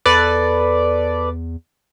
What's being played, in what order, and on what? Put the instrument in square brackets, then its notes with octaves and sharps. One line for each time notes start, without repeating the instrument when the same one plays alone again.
[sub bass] E2 [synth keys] A4 B4 D5